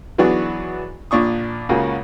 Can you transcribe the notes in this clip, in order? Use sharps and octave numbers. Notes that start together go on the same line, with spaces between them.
E3 F#3 B3 D4 F#4 G#4
A#1 A#2 D4 C#6 D#6
C#2 C#3 A#3 F#4